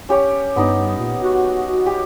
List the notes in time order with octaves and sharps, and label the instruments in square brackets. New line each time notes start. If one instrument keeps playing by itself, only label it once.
[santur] C#4 G4 C#5
[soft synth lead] G2 [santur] B3 D#4
[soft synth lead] A#2
F#4
[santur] G4